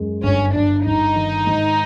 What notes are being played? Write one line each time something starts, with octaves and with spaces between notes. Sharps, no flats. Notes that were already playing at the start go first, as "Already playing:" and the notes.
Already playing: F#2 G#3
G1 C#4
G1 D4
G1 D#4
D#3
G#2